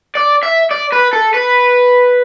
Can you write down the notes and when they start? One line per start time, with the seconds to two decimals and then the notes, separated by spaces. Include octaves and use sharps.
0.15 D5
0.43 E5
0.71 D5
0.93 B4
1.13 A4
1.34 B4